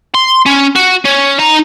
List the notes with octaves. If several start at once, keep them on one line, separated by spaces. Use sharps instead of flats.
C6
C#4
F#4
C#4
D#4 A#5